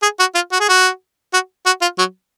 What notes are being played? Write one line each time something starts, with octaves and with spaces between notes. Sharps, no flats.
G#4
F#4
F4
F#4
G#4
F#4
F#4
F#4
F4
F#3